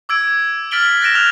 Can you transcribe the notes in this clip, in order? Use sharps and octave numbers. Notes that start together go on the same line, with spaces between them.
D6 E6 G#6 D7
F6 A6 B6 D7 F#7 G7
F#6 A6 A#6 D7 E7
F6 F#6 F7 G7